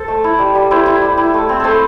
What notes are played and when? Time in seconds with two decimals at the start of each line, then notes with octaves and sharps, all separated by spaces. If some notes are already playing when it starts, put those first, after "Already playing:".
Already playing: A4 C5
0.08 A3
0.24 E4
0.39 G3
0.55 G3
0.71 E4 C5
0.86 E4
1.02 G3
1.18 E4
1.34 A3
1.49 C4
1.60 A3 A4 C5